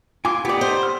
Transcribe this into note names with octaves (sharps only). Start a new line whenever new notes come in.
F4 G#5 D6
B3 D#4 G4 D5
C5
F6